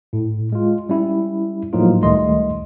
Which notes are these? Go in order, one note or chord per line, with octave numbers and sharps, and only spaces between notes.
A2
G#3 F4
G3 C#4 E4
A2 F3 F#3 A#3 D#4 F4
C#2 D#3 G3 A3 D#5 C6